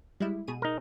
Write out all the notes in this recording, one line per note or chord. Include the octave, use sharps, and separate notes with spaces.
G3 G#3 E4
B2 G#4 D#7
D#4 A#4